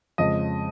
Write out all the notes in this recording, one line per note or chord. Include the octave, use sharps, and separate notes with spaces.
F2 C#3 G#3 D#5